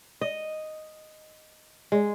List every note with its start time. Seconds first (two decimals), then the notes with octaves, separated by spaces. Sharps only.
0.21 D#5
1.92 G#3